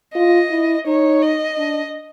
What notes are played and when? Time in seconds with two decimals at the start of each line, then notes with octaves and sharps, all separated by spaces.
0.14 F4 D#5
0.51 E4
0.86 D#4 C#5
1.22 D#5
1.57 D4